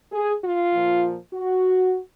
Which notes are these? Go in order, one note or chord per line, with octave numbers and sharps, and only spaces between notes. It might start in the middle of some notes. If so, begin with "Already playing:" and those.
G#4
F4
A#2 F3
F#4